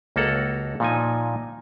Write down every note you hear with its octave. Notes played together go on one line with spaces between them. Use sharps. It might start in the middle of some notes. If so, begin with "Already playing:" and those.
C#2 A#3 F#4 A4 F#5 A#5
A#2 F3 D#4 G#5